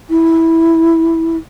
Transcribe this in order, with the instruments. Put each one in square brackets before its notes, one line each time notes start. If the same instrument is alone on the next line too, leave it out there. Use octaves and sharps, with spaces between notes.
[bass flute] E4